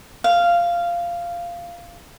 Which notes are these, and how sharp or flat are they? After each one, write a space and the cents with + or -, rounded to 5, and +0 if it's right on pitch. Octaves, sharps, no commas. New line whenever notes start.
F5 -10